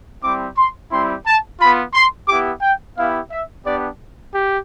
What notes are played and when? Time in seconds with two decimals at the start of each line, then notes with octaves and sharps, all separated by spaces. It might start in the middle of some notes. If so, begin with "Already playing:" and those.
0.23 G3 C4 E4 D6
0.57 C6
0.91 G3 C4 E4 C6
1.26 A5
1.60 B3 F4 B5
1.94 C6
2.28 B3 E4 G4 D6
2.62 G5
2.96 B3 E4 G4 F5
3.31 E5
3.65 B3 D4 G4 D5
4.33 G4